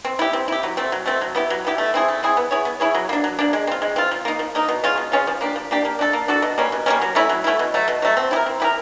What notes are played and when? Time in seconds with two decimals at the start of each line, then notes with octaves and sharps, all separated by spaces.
0.05 C4
0.19 E4 G4
0.33 C4
0.48 E4 G4
0.63 F#3
0.77 A3 C4
0.92 F#3
1.06 A3 C4
1.21 F#3
1.35 B3 E4 G4
1.50 F#3
1.65 B3 E4 G4
1.78 A3
1.94 C4 E4 G#4
2.08 A3
2.23 C4 E4 G#4
2.37 B3
2.51 E4 G#4 C#5
2.65 B3
2.80 E4 G#4 C#5
2.95 F#3
3.09 A#3 D4
3.24 F#3
3.39 A#3 D4
3.53 G#3
3.67 C4 F4
3.82 G#3
3.96 C4 F4
4.11 F3
4.25 A#3 D#4
4.39 F3
4.55 A#3 D#4
4.68 B2
4.84 G#3 C#4 F4
4.98 B2
5.12 G#3 C#4 F4
5.27 F3
5.41 A#3 D4 G4
5.56 F3
5.71 A#3 D4 G4
5.85 A#3
5.99 D4 F#4 A4
6.13 A#3
6.28 D4 F#4 A4
6.42 B2
6.58 G3 A#3 C#4
6.72 B2
6.86 G3 A#3 C#4
7.01 F#3
7.15 A3 C#4 E4
7.29 F#3
7.44 A3 C#4 E4
7.59 B2
7.74 F#3 A3
7.88 B2
8.02 F#3 A3
8.17 C4
8.31 E4 G4
8.36 A#4
8.46 C4
8.60 E4 G4
8.64 A#4